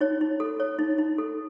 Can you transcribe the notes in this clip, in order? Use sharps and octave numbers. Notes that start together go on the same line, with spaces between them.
D#4 C#5
D#4
A4
C#5
D#4
D#4
A4